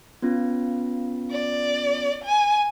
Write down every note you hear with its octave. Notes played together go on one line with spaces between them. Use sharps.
B3 C#4 F4
D5
G#5